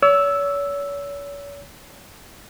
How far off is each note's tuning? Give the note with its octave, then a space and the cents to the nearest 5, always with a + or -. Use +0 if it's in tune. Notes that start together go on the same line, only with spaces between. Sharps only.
C#5 +40 E6 +0